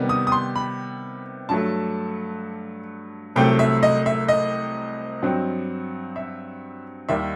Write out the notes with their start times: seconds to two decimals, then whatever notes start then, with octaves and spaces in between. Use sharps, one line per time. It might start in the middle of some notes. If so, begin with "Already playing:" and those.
Already playing: C3 D#3 G3 B3
0.09 D#6
0.27 D#6
0.32 C6
0.56 B5
1.49 G2 F#3 A3 A5
3.36 C2 C3 F#3 A3 G5
3.59 E5
3.83 D#5
4.06 E5
4.28 D#5
5.22 G2 F#3 C4
6.16 E5
7.09 D#2 D#3 G3 E5